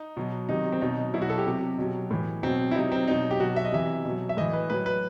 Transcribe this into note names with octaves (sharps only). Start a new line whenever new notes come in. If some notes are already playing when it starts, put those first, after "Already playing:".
Already playing: D#4
B2 F#3
C3 D#3 F#3 D#4
C4
B2 F#3 D#4
B2 F#3 E4
F#4
A4
G4
C3 F#3
B2 F#3
A2 E3
B2 F#3 C4
E4
C3 F#3 D#4
C4
B2 F#3 D#4
G4
B2 F#3 F#4
E5
D#5
C3 E3 E5
B2 F#3
E5
A2 E3 D#5
B4
A2 F#3 B4
B4